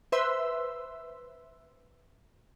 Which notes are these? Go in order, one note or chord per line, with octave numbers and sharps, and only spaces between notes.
B4 C5 E5 C6 E6